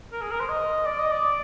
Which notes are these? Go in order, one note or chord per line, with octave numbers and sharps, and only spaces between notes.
A#4
G#4
A#4
C5
D#5
D5
D#5
D5